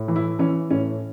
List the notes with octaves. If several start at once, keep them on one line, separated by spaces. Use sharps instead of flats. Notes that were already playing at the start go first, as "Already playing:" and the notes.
Already playing: A2
E3
E4
E3 C#4
A2 C#4